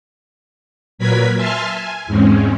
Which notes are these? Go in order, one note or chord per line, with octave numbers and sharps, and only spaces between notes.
A#2 F#3 A#4 B4 G#6 B6
E5 G#5 A5 C6 F6
G#5
E2 G#2 G#3 C4 C#4